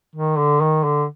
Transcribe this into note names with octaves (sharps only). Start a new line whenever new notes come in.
D#3
D3
D#3
D3